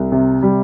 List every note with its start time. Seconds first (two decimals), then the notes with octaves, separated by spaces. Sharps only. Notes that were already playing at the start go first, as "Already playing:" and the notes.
Already playing: C2
0.12 C3
0.43 G3